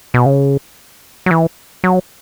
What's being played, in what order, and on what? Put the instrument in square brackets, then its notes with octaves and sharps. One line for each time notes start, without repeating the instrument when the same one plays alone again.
[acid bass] B2
C#3
F#3
E3
F#3